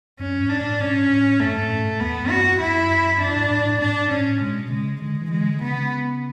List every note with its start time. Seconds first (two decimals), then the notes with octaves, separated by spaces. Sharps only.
0.20 F#2 C#4
0.40 G#2
0.50 D4
0.61 A2
0.80 G#2 C#4
1.10 A2
1.40 F#2 A3
1.55 G#2
1.70 A2
1.85 G#2
2.00 E2 B3
2.21 F#2
2.31 F#4
2.40 F#2
2.60 F#2 E4
2.91 F#2
3.21 F#2 D4
3.36 G#2
3.51 A2
3.66 A2
3.81 G#2 D4
4.11 A2 C#4
4.41 B2 G#3
4.70 C#3 G#3
5.01 D3 G#3
5.21 E3
5.31 G#3
5.41 D3
5.61 C#3 B3